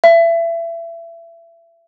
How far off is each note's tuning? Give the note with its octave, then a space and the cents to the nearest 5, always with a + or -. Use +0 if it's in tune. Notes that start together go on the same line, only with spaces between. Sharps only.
E5 +25